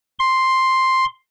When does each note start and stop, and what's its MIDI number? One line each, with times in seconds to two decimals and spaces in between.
0.19 1.05 84